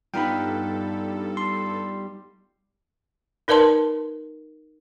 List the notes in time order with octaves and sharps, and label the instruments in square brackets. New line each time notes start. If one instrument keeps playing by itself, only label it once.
[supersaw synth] G2 A4 [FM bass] G3 [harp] B3 D#4 F4 [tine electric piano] G5 B5
[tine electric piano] C6
[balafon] D#4 A#4 B4 D5 A5 C6